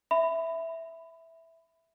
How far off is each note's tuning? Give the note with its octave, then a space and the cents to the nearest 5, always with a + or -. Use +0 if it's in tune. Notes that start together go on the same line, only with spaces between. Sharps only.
E5 +0 B5 +20